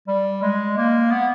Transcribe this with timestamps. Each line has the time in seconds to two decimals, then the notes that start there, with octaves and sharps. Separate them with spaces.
0.08 G3
0.42 G#3
0.77 A#3
1.11 B3